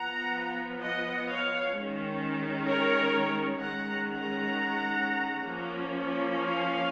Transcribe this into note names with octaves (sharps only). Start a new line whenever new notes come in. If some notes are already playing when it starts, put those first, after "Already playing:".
Already playing: F3 B3 F#5 A#5
D#5 F#5
C#5 F5
D#3 G#3 C#4
A#4 C#5
D#3 G#3 C#4 F#5 A#5
F#5 A#5
F3 A#3 C#4
F5 G#5